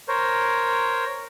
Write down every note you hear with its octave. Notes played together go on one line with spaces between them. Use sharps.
A#4 C5 C#5